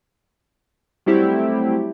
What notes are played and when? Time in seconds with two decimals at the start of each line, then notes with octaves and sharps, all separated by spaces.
1.06 F#3 G3 A3 C4 E4 G4